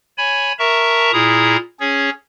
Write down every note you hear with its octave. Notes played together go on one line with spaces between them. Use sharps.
C#5 G#5 B5
A#4 E5 A5 A#5 C#6
A#2 E4 G#4 A#5 D#6
C#4 G#4 C#5